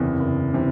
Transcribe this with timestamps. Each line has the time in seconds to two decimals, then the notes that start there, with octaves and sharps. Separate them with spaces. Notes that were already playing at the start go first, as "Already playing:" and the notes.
Already playing: F#1 E2 C3 E3
0.19 F#1
0.54 C3 E3